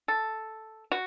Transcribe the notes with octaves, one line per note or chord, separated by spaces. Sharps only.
A4
F#4